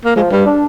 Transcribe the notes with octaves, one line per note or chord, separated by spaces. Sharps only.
A#3
F3 G#3
G2 G3
D4